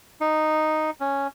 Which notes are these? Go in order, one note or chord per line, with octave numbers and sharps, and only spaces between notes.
D#4
C#4